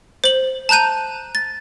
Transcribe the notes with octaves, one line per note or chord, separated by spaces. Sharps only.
C5 F#7
A5 A#5 F#6 G6 D#7
A6